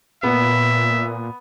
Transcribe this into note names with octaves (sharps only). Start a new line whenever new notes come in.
A#2 B3 E5